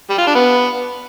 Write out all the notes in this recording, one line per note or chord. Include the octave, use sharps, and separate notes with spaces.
G3
F4
D4
B3